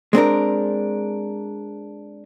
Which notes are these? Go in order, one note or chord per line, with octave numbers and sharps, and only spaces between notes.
G#3 C4 D4 A#4